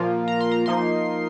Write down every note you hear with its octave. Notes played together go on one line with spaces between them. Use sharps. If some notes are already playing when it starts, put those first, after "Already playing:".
Already playing: A#2 F3 A#3 F4
A#5
C6
A#5
F3 A#3 D#4 C6